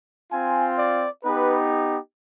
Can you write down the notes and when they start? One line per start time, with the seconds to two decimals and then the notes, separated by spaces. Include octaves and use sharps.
0.31 C4 F4 G#5
0.77 D5
1.23 B3 D#4 G4 B4